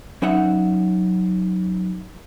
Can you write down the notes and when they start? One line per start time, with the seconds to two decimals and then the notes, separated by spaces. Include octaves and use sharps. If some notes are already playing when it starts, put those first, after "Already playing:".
0.22 F#3 C#4 D#4 E5 F#5